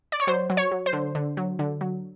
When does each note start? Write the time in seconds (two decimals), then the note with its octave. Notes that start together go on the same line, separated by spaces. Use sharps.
0.12 D5
0.20 C#5
0.27 F#3 C5
0.50 F#3
0.57 C#5
0.71 F#3
0.86 C5
0.93 D3
1.15 D3
1.37 F#3
1.59 D3
1.81 F#3